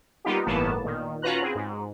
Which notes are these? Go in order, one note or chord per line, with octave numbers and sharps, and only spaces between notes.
G3 A#3 B3 D#4 F4 G4
G1 A2 E3 A#3 B3 A5
A#2 D#3
C#4 F4 F#4 B4 A#5 F#6
C4 G#4
G#2